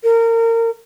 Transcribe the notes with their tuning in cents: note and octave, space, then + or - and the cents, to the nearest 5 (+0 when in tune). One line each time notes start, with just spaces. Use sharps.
A#4 -25